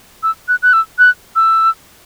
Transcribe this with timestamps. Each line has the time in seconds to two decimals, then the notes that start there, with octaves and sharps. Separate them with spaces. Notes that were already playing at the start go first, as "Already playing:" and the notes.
0.23 E6
0.48 F#6
0.62 F#6
0.73 E6
0.99 F#6
1.36 E6